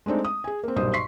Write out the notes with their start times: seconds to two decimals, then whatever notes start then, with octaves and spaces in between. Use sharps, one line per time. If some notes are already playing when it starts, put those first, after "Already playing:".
0.06 G#3 A3 C4 D4 D#4
0.25 D#6
0.44 G#4 G#5
0.64 A#3 C4
0.76 B1 G2 A#2 C5 D#6
0.93 C6 C#6 B6 C7